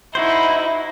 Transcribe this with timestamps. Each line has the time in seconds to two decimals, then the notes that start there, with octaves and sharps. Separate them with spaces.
0.15 D#4 E4 F#4 C5